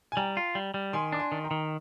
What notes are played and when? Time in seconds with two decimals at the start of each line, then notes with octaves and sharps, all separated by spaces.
0.12 G#5
0.17 G3 G5 A#5
0.37 F4
0.55 G3
0.74 G3
0.93 D#3 G#5 C6
1.12 D4 D6
1.19 G#5 C6
1.32 D#3
1.44 G5 A#5
1.51 D#3